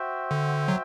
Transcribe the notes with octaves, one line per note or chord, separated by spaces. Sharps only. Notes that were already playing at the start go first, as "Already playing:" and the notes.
Already playing: F#4 C5 E5 G5
D3
F#3